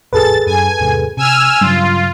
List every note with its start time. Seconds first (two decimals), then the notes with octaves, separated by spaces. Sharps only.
0.13 A1 F2 E3 G#4 A4 B4 A6
0.46 F#2 G#5
0.80 E2 G#2 C3
1.17 C3 G#5 E6 F6
1.61 G2 C#3 F#3 G3 F4